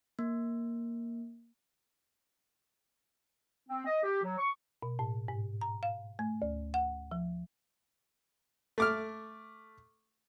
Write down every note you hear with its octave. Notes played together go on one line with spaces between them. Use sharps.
A#3
C4
D#5
G4
F#3
C#6
B2
A2
G#2
A#5
F5
A3
D2
F#5
F3
A3 D6 F6